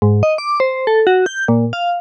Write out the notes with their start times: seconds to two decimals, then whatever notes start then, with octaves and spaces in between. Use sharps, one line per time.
0.02 G#2
0.23 D#5
0.38 D6
0.60 C5
0.87 A4
1.07 F#4
1.26 G6
1.48 A#2
1.73 F5